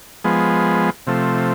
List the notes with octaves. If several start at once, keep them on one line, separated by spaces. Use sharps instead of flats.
F3 G#3 B3
C3 F3 A3